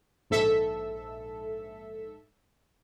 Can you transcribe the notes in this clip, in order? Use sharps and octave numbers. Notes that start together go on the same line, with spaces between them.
A#1 G#2 A4 E5